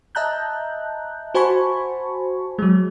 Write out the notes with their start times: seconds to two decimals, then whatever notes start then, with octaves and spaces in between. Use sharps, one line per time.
0.15 D#5 E5 A5 A#5 F#6 G6
1.34 F#4 C5 G#5 A5 B5 C#6
2.59 F#3 G#3